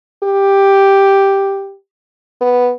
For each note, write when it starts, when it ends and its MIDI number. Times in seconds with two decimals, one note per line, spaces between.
0.23 1.75 67
2.41 2.72 59